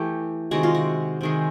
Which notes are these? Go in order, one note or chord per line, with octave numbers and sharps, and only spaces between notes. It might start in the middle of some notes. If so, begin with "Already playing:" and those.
Already playing: E3 A3 G4
C3 D#3 G#3 F#4
F4
F#4
C3 D#3 G#3